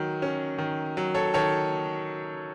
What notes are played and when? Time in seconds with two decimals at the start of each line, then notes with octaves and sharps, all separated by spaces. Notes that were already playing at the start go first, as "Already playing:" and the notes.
Already playing: D#3 F#3
0.22 C#4
0.58 D#3
0.97 F#3
1.15 A4 C#5
1.34 D#3 A4 C#5